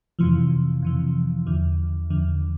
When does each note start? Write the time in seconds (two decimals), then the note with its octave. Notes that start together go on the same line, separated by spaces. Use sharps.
0.19 F2 C3 E3 F3
0.82 F2 C3 E3
1.46 E2 D3 F3
2.10 E2 D3 F3